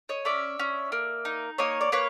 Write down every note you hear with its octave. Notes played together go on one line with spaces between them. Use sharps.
C#5 D#5
C#4 D5 E5
C#4
A#3
D#4
A#3 C#5 D#5
D5
A#3 B4 C#5